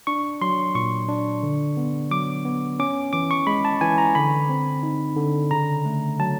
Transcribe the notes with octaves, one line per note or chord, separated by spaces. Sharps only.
D4 C#6
F#3 C6
A#2 C#6
D4
D3
B3
F#3 D6
B3
C#4 D6
E3 D6
C#6
G#3 B5
A5
E3 G#5
A#5
D3 B5
C4
D#4
D3
C#3 A#5
A3
F#3 A5